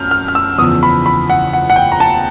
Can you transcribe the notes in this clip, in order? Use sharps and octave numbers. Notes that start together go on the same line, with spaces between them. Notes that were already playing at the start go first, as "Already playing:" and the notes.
Already playing: F#2 F6 G6
F6
F6
E6
E2 C#3 F3 D#6
B5
B5
F#5
F#5
F#5
G5
A#5
A5